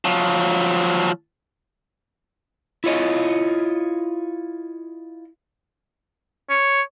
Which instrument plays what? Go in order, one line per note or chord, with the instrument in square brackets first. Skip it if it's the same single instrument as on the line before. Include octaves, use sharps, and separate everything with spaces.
[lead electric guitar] F3 F#3
[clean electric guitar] E4 F4 C#5 D#5
[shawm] C#5